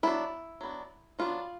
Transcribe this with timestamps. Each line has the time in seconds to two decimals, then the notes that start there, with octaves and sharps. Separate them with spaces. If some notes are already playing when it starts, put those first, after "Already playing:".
0.03 F#3 B3 D4 E4
0.61 F#3 B3 D4
1.19 F#3 B3 D4 F4